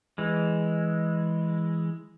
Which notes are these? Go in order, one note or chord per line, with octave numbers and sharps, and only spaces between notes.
E3 G#3